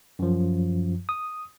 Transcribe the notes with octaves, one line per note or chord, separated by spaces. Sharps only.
F#2 F3
D#6